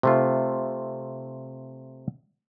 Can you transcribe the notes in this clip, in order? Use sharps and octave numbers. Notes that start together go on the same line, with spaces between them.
C3 A3 F4